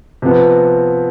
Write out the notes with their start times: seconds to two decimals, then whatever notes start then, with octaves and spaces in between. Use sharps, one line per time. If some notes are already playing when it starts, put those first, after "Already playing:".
0.22 C3 F3 B3